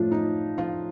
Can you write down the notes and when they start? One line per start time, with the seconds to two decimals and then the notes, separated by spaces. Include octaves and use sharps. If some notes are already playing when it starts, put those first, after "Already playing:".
Already playing: A2 F3 A3 D4 F4
0.12 D#4
0.58 F3 F4